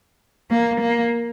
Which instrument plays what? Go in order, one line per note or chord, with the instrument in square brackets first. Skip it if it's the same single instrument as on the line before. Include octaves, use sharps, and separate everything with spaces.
[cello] A#3
A#3